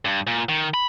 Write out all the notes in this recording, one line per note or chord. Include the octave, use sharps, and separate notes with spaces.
G2
A#2
D#3
B5